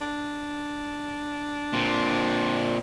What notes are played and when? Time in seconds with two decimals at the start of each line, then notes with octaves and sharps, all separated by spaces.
0.01 D4
1.73 A#2 C4